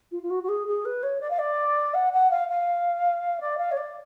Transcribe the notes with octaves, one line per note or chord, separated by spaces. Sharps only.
F4
F4
F#4
F#4
G#4
G#4
B4
C#5
D5
F5
D5
F#5
F#5
F5
F5
D5
F5
C#5
D5